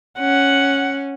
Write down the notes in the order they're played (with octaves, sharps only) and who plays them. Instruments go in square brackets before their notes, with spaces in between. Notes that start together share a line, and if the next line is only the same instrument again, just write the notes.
[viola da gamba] C#4 [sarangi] F#5